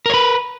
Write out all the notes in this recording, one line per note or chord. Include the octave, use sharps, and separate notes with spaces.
A#4 B4 C#5